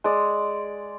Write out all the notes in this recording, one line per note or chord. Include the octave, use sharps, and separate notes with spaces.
G#3 D5